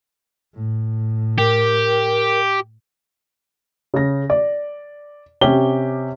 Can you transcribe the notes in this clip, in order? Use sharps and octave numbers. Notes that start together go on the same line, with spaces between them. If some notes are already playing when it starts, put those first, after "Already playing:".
A2
G4 A#4
C#3 A#6
D5
C3 C#4 G4 G7